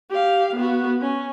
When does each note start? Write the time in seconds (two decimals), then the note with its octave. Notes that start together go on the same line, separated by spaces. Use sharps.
0.10 G4 F5
0.55 B3 F#4
1.01 C#4